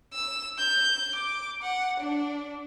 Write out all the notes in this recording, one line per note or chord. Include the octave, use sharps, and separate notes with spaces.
E6
G6
D6
F#5
D4